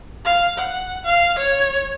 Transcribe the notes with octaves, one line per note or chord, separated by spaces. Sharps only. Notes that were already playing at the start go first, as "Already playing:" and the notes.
F5
F#5
F5
C#5